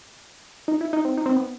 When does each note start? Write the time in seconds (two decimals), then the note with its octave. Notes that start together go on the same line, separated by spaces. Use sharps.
0.68 D#4
0.81 E4
0.93 D#4
1.05 C4
1.17 D#4
1.26 C4
1.36 B3